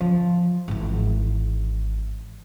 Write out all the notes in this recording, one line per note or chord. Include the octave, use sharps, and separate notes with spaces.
F3
G#1 E3